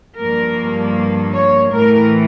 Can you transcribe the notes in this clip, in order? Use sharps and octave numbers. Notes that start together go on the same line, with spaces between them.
G2 F3 A#3 A#4
C#5
A2 E3 A3 A#4